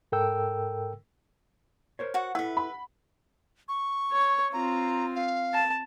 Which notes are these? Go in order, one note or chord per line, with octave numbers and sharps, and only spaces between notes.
G#2 A4 A#4 G5 E6
A#4 C5 C#5
F#4 F#5
E4 A4 B4 E5 F#5
B5
C#6
C#5
C4 F4 A#5
F5
A5